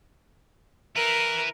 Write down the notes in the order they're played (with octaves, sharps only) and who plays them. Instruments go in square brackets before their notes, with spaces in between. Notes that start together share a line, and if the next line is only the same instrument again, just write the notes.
[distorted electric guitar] E4 B4 [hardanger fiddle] A#4